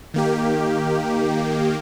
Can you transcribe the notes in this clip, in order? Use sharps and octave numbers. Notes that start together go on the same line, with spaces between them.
D#3 A#3 G4